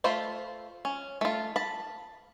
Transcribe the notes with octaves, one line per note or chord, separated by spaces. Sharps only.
A3 F4 C5 B5
C#4
A3 F4
A5 B5